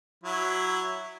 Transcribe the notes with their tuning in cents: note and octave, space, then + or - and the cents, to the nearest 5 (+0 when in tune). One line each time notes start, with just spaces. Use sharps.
F#3 +0 E4 +0